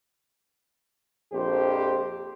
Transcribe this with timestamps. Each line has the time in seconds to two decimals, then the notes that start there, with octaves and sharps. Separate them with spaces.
1.33 A#1 F2 G4 C5